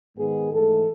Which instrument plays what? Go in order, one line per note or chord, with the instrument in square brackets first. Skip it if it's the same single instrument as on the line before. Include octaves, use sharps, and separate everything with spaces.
[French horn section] G#2 D#3 G#3 B3 G#4
G#2 E3 A3 A4